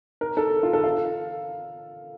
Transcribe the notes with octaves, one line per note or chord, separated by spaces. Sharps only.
A#4
A4
F4
A4
F5